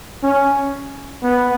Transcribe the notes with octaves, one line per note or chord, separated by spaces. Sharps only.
C#4
B3